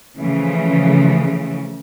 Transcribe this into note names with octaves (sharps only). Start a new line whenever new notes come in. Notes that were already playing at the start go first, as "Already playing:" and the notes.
C#3 E3 F3 A3